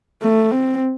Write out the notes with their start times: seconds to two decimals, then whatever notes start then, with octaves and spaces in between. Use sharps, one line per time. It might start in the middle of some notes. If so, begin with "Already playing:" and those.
0.22 A3
0.51 C4